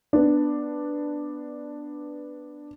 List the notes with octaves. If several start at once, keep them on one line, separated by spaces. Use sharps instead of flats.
B3 D4